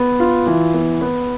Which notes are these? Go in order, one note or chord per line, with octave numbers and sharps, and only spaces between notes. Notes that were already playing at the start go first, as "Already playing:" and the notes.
Already playing: B3
F4
E3
B3
B3